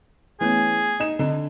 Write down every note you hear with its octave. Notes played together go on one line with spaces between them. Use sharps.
E3 A3 B3 C#4 G#4
D#4 E7
D3 C4 D4 D#5